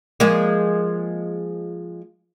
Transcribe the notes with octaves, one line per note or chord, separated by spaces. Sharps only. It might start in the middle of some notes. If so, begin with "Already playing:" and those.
F3 G#3 A#3